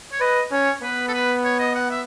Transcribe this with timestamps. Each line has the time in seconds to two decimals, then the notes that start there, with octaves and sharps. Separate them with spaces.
0.12 C#5
0.20 B4 D#5
0.51 C#4 C#5
0.82 B3 B4
1.08 A4
1.13 B4
1.44 C#5
1.59 D#5
1.75 F#5
1.90 E5